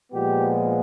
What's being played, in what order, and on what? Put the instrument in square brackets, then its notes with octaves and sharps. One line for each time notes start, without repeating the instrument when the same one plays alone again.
[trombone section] A#2 F3 G#3 B3 G4